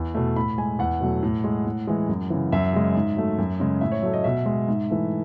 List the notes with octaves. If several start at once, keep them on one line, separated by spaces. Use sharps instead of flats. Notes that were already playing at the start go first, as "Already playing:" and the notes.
Already playing: E2
B2 A3
A2 B5
G#3 G#5
E2 F#5
B2 F#3 A3
A2
G#3
A2
E3 G#3
F#2
C#3 E3
F#2 E5
C#3 G#3
G#2
F#3 A3
F#2
C#3 G#3
A2 E5
C#5
F#3 A3
D#5
B2 E5
G#3
G#2
E3 A3